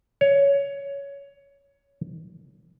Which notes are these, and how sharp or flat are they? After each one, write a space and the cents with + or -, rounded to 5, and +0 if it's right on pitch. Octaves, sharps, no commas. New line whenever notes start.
C#5 +15